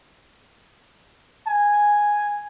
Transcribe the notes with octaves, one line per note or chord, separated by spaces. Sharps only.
G#5